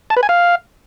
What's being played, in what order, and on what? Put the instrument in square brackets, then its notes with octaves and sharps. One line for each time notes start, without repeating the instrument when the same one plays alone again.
[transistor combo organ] A5
B4
G#5
F5